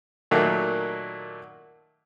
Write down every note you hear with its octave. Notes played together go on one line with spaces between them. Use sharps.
A#2 D#3 F#3 A3 A#3